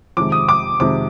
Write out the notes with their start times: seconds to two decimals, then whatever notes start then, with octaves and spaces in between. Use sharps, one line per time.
0.17 F2 C3 D#3 G#3 D6
0.32 D#6
0.49 D6
0.80 F2 C3 D#3 G#3 D6